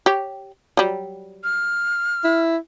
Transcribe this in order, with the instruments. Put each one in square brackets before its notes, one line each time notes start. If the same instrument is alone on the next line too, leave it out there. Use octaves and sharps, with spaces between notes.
[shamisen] G4 C#5
F#3 G3
[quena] F6
[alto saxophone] E4